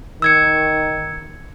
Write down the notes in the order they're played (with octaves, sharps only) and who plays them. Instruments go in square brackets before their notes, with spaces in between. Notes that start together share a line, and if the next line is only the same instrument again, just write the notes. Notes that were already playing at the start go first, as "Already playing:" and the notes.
[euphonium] D#3 [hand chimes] E6 G#6 C#7